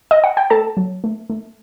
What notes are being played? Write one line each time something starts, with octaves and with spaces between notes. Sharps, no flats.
D#5
F#5
G5
A3 A4 A5
F#3
A3
A3